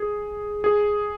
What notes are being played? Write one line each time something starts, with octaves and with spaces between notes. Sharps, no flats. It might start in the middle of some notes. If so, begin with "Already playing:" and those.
Already playing: G#4
G#4